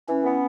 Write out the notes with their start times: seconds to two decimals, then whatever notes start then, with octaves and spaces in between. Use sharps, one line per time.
0.08 E3 C#4
0.24 B3